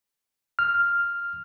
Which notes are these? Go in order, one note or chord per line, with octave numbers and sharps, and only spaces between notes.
F6